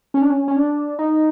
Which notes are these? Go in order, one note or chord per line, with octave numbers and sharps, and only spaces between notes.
C#4
D4
C#4
C#4
D4
D#4